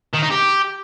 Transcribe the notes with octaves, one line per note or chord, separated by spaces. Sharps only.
D#3
D#4
G4